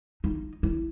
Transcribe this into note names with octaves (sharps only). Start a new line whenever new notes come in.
D#4
E4